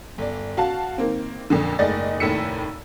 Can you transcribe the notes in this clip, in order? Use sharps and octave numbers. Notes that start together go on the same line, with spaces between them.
G1 D5
F#4 F5 A5
D#3 A#3 C4
F2 A#2 D3
F#1 G#2 A3 D5 D#5 A6
F1 D#2 A2 E6 B6 C#7